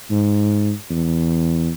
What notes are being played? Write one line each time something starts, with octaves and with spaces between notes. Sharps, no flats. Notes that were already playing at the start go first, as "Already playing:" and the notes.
G#2
E2